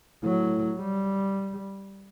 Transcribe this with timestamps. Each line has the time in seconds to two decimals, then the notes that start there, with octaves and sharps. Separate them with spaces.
0.23 A2 F#3
0.79 G3